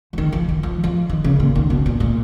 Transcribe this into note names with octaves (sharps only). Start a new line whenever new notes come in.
F3
D#3
F3
D#3
F3
F3
D#3
C#3
A#2
D#3
B2
A#2
A#2